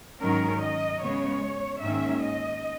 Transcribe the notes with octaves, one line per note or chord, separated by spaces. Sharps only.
G#2 D#3 F#3 C#4 A#4
D#5
C#3 G#3 B3 C#5
G#2 D#3 A#3 C#4 E5
D#5